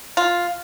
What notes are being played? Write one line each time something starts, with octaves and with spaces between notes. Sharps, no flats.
F4